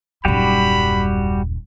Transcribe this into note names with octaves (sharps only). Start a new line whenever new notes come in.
D#1 F#2 G3 F#4 G4 B5